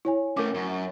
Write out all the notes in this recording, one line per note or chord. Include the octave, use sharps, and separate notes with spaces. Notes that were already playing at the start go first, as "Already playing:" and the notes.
E4 C#5 G#5
A3 C#4 A#4 D6
F#2